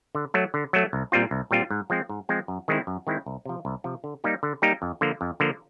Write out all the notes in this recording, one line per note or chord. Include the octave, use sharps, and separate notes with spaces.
D3
F#3 A3
D3
F#3 A3
C2
A#2 G3 C4 F4
C2
A#2 G3 C4 F4
G#2
F3 G#3 C4
G#2
F3 G#3 C4
F#2
D#3 G#3 C4 E4
F#2
D#3 G#3 C4 E4
C2
C3 F3
C2
C3 F3
D3
G3 A#3 D#4 G4
D3
G3 A#3 D#4 G4
F2
D3 F3 A#3
F2
D3 F3 A#3